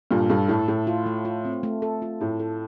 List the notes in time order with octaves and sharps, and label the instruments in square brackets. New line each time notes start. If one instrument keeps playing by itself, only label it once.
[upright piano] G2 A#2 [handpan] A4
[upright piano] G2 [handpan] A4
[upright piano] A2 [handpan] A4
[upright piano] A2 [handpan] A3
[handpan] F4
A3
F4
C4
A3
A4
F4
[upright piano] A2 [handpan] A3
[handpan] A4